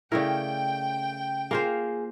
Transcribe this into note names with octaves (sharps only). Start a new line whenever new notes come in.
C#3 A3 E4 A#4 D5 G5
A#3 F4 G#4 C5